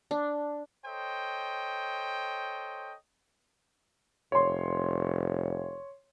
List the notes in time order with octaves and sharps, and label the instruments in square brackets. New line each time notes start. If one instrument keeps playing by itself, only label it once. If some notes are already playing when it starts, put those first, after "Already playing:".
[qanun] D4
[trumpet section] A4 C5 C#5 D#5 G5
[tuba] F1 [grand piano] C#5 C6